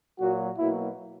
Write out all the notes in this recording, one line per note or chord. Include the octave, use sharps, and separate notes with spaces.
A#2 F#3 A#3 F#4
B2 F#3 A#3 E4